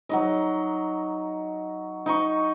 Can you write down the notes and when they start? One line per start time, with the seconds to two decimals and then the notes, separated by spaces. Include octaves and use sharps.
0.09 F#3 D#4 D#5
2.06 D#4 D#5 C#6